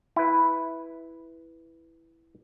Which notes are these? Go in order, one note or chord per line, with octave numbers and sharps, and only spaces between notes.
E4 B4